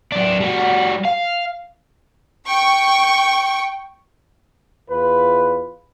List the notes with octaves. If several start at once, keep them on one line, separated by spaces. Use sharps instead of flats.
F#3 D4
G3 F#4
F5
G5 C#6
E2 F4 B4